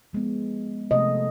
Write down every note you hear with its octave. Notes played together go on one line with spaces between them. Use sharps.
F3 G#3 B3
C3 F3 A3 D#5